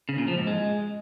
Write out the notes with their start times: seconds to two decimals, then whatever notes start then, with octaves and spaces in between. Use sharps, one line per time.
0.09 C#3
0.18 A#2
0.28 F3
0.37 G#2
0.47 G#3